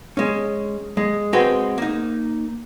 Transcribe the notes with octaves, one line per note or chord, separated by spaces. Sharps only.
G#3 C#4
G#3
G#3 C4 F#4 B4 G5
A#3 D#4